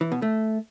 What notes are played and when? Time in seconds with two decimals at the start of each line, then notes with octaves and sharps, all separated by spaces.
0.01 E3
0.12 B2
0.22 A3